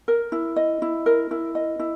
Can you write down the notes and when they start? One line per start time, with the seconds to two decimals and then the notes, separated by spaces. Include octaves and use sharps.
0.08 A#4
0.32 E4
0.56 D#5
0.82 E4
1.06 A#4
1.31 E4
1.55 D#5
1.80 E4